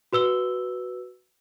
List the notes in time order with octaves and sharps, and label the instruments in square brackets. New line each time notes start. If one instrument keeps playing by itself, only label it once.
[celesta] F#4 B4 E6 G7